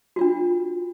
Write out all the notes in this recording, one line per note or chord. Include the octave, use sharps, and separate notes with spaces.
D4 F4 F#4